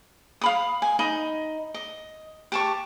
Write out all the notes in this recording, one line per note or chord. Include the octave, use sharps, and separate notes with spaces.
F5 B5 D#6
G#5
D#4 D#5 B5
D#5
G4 A5 C#6